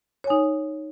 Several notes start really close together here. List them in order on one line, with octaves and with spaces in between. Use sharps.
C#5 G#5 D#4